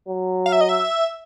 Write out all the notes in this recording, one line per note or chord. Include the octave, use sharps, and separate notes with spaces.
F#3
F5
E5
D#5
E5